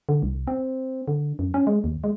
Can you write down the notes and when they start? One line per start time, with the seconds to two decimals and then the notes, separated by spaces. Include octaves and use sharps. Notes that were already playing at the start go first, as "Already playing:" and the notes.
0.09 D3
0.23 C2
0.47 C4
1.08 D3
1.39 F#2
1.54 C#4
1.67 G#3
1.84 D#2
2.04 G#3